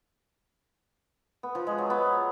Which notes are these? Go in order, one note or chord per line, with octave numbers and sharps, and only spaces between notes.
B3
F3
G#3
F#3
B3